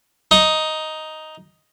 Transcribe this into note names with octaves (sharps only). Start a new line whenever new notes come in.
D#4